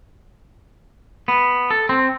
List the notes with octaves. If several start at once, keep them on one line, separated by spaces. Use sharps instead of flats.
B3
A4
C4